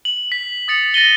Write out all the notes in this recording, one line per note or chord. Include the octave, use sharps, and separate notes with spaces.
F#7
B6
D#6 A6 C#7 F7
A6 A#6 D#7 G7